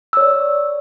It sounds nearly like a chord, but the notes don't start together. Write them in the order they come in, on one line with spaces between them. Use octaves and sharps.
E6 C#5 D5